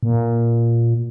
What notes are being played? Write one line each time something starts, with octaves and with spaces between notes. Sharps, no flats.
A#2